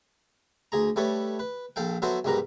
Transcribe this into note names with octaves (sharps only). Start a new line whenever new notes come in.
D2 G#4 A#5
G3 A3 A4 B4 C#5
B4
A#1 A4 F5 G5
F#3 B3 F#4 A4 C5 E5
B1 G#2 G3 A#4 B4 A#5